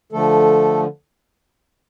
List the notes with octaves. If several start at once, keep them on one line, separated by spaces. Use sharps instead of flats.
D3 F3 A3 A4